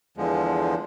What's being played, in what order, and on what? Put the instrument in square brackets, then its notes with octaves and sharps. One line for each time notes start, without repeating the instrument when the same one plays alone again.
[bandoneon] E2 D3 F3 G#3